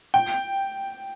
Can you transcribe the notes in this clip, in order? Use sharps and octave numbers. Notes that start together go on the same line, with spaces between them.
G5